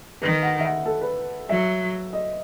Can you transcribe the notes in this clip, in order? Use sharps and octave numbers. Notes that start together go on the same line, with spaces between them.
D#3 B4
F#5
E5
F#5
A4
B4
F#3 E5
D#5